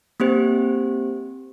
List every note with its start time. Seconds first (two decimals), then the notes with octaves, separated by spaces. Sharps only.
0.20 A#3 C4 G4 C5